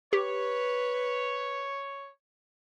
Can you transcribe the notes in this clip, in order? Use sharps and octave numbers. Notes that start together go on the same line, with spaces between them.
G4 B4 C#5